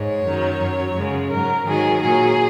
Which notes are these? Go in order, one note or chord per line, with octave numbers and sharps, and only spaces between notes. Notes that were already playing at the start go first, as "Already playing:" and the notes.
Already playing: G#2 G#3 C#5
F#2 D#3 F#3
F#2 F#3
F#2 C#3 G#3
G#2 F#3 A#4
G#2 D#3 F#3 G#4
A#2 F#3 G#4